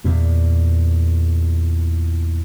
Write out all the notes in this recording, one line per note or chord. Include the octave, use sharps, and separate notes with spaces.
E2 A#2